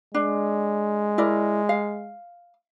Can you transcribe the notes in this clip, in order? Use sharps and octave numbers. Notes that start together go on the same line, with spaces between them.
G#3 D4
E4 A#4 D5
F5